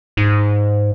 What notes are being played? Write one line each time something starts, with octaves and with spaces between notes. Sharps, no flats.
G#2